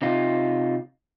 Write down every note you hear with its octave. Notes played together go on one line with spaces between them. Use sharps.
C3 D#4 F4